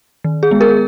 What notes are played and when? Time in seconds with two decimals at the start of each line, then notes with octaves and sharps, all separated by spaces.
0.24 D#3
0.43 G#4
0.51 G#3 B3
0.61 G#4 A#4